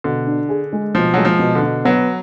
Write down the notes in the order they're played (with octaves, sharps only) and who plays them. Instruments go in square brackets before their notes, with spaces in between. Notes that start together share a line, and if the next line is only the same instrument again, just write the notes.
[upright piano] B2 [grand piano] D3
[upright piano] D4
G#4
G#3
[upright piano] B2 [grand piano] F3
[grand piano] F#3 [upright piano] G#3
[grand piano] F3
[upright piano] B2
[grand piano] D3
[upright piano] B2
[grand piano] F#3 [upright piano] B3